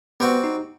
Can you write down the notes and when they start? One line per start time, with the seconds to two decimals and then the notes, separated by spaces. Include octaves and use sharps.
0.20 G3 B3 C4 F#4 B4
0.44 D#4